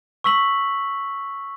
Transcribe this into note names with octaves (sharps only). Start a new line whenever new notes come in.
C#6 E6 B6 F#7